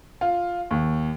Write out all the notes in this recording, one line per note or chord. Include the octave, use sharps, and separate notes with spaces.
F4
D#2